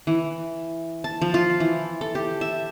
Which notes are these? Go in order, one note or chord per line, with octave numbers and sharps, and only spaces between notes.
E3
A5
F3
F4
E3
A4
G4
E5